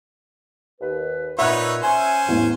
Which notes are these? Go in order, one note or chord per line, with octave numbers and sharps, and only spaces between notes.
D#2 B4
A#2 D#4 B4 C#5 E5 F#5 F#6
C#4 C5 G#5
A1 E2